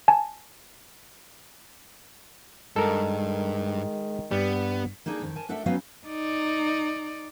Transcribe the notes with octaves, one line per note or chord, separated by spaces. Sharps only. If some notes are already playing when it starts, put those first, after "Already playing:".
G#5 A5
G2 D#3 G#3 A4 A#4
G2 G3 B3
A#3 D4 D#4 G#4 A4
F2 D#3
A#4 G#5 A5
A3 D4 A4 A#4 E5 F#5
F#3 B3 C#4 D#4 F#4 F5
D#4 D5